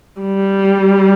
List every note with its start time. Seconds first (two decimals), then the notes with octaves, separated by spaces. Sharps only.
0.21 G3